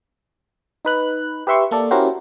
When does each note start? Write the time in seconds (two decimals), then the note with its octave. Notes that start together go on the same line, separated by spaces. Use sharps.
0.85 D#4 B4 F#6
1.47 G4 B4 E5 C6 C#6
1.71 A#3 A4 D5
1.91 C#4 E4 F#4 G4 A#4 C5